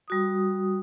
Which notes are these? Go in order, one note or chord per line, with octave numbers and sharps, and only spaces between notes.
G3 F#4 D#6